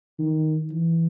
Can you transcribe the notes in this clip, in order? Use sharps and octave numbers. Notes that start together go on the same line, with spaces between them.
D#3
E3